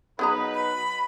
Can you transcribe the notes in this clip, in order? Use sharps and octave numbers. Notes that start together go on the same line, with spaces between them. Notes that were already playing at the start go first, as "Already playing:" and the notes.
F#3 B3 D#4 G#4 B4 A#5
B5